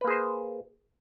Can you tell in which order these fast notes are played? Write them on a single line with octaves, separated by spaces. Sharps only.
B4 A#3 G#4 C5